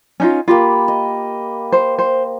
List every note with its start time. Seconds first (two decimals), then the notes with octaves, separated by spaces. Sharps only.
0.20 C#4 D#4 F4
0.48 A#3 F4 G4 B5
0.88 D#5
1.72 C5
1.99 C5